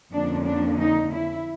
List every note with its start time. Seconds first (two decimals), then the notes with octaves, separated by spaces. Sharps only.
0.13 F2 D3 F3 A#3 C#4 D4
0.46 D4
0.80 D#4
1.14 E4